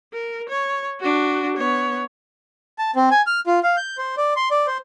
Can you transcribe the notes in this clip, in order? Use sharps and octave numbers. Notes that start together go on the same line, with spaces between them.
A#4
C#5
D4 F#4
B3 C#5
A5
C4
G#5
F6
F4
F5
G6
C5
D5
C6
D5
C5